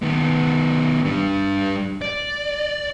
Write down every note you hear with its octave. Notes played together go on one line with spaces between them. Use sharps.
D#3 B3
G3 D4
D5